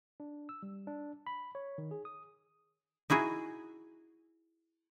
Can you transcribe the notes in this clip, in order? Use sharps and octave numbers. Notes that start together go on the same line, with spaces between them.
D4
E6
G3
D4
B5
C#5
D#3
G#4
D#6
D#4 E4 F#4 G#4